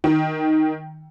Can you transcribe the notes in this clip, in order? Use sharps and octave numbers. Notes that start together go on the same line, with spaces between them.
D#3